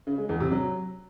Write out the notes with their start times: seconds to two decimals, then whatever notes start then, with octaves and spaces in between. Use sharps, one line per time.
0.07 C#3
0.18 G#3
0.29 E2
0.40 C3
0.52 F#3